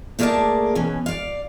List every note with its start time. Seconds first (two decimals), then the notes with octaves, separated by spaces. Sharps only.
0.19 A3 A#3 G#4 A#4 D5 A5
0.75 B2 E3 C#4
1.06 D5 F5